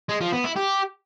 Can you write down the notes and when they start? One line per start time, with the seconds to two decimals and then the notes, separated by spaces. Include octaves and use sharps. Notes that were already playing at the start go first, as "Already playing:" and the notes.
0.09 G#3
0.21 F3
0.32 B3
0.44 E4
0.56 G4